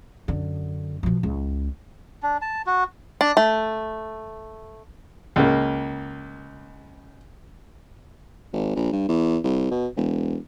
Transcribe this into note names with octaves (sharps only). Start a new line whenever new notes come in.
F#2 D3
B2 F3
C#2
D4
A5
F#4
D4
A3
C#2 C#3 A#3
G#1
A#1
G2
E2
C2
B2
E1